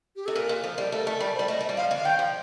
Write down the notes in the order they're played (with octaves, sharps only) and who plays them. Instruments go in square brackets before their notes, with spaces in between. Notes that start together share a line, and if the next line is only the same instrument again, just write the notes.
[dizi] G4
[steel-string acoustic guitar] C3 [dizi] A4
[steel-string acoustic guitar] A#2 [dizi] A#4
[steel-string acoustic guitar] A#2
F3
G3
[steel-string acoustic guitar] A3 [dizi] A4
[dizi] A#4
[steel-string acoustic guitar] A3 [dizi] A4
[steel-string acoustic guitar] G3 [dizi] A#4
[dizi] C5
[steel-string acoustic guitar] G3
[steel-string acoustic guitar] A3 [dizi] D#5
[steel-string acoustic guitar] A3
G3
[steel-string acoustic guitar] F3 [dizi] F5
[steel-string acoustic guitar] D3
[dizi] F5
[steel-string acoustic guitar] D#3 [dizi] G5
[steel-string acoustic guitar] F3